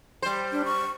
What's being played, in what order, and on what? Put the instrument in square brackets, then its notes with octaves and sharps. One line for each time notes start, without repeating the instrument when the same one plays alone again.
[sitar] G3 C5
[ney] D4
C#6